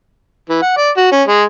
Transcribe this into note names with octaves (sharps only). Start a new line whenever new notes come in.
E3
F#5
D5
F#4
C#4
G#3